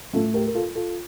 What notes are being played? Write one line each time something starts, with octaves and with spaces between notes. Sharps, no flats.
A2 A3 F4 A4
G4 A#4
A#4
F4 A4
F4 A4